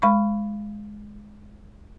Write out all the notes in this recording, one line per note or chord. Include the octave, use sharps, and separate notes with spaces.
G#3 B5 C#6